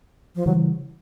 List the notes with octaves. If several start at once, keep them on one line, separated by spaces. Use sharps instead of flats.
F3
C#3 E3 F#3 G3